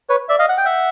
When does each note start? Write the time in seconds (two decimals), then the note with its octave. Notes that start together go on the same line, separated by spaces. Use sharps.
0.09 B4 C#5
0.29 D5 E5
0.39 D#5 F5
0.49 F#5
0.57 G5
0.65 E5 F#5